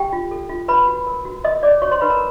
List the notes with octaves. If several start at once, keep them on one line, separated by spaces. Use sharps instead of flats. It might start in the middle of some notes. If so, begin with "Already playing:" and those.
Already playing: G4 G5
F4
A4
F4
B4 C#5 B5
F#4
A#4
F#4
A#4 D#5 D#6
C#5 D5 D6
F#4 C#5 C#6
C5 C6
D#4 B4 B5
A#4 A#5